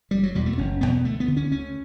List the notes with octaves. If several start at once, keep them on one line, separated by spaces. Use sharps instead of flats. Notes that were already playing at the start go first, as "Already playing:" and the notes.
F#1 G3
F#3
E2 B2 G3
A3
F#1 C#4
B2 B3
E2
D2 A3
B3
D3
C#4
D2 C#4